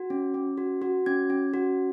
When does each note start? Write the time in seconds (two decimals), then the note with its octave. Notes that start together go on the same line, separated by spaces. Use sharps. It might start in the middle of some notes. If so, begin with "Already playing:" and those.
Already playing: F#4
0.10 C#4
0.34 C#4
0.58 F#4
0.82 F#4
1.06 C#4 G#6
1.30 C#4
1.54 F#4